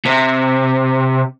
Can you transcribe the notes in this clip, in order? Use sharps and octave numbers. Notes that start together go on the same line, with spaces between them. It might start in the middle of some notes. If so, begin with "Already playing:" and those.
C3